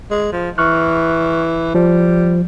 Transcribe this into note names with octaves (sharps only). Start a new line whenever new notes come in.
G#3
F3
E3 C#6 F6 F#6
F3 G3